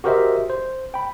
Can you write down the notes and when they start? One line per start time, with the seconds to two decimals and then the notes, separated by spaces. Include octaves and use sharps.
0.04 F#4 G4 A#4 C5 D#5 E5
0.50 C5
0.94 G5 B5